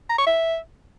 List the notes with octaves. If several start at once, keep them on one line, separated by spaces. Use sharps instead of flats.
A#5
C#6
E5